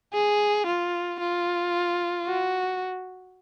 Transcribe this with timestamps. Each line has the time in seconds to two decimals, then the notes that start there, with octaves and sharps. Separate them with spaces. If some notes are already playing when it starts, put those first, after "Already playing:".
0.13 G#4
0.66 F4
1.20 F4
2.26 F#4